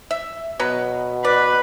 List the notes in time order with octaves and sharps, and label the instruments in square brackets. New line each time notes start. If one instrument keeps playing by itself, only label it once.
[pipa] E5
[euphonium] B2 [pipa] F#3 B3 B4
[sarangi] B4 [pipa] D5